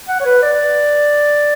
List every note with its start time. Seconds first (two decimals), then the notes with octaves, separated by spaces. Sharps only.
0.08 F#5
0.20 C#5
0.25 B4
0.42 D5